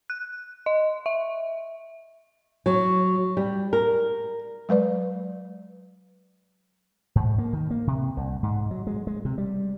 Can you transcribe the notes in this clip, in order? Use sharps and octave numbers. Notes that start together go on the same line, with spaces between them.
F#6
D#5
E5
F#3
G3
A#4
F#3 G#3 B4 D5
G#2
A#3
D#3
A#3
C3
C2
G#2
F#3
G#3
G#3
C3
G3